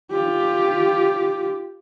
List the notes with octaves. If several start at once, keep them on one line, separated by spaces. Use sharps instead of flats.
F4 G4